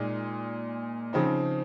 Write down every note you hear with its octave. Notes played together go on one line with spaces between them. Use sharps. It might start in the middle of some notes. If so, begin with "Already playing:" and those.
Already playing: A#2 G#3 D#4
C#3 F3 C4 D#4